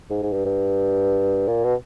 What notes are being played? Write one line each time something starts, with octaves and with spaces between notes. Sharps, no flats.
G#2
G#2
G2
G2
A#2
B2